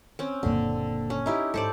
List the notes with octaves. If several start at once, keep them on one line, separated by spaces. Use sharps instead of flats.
C4 C#4
F#1 A#2 D3
C#4
D#4 E4 G4
G#2 A4 C5 D5